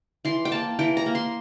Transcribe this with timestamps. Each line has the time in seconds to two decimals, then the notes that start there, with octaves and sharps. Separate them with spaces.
0.25 E3 C6
0.45 G5
0.52 A#3 A5
0.79 E3 G5
0.97 A#5
1.06 A#3
1.15 C6